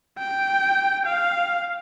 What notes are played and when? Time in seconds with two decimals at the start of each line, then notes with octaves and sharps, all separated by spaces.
0.18 G5
1.06 F5